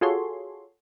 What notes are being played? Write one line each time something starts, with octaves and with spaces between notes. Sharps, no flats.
F4 F#4 G#4 A4 C#5 C6